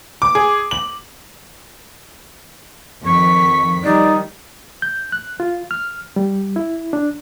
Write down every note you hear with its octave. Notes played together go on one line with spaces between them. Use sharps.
D6
G#4
F#7
F2 D#3 C#6 B6
D#3 F3 G3 D#4 D5
G6
F#6
F4
F6
G3
E4
D4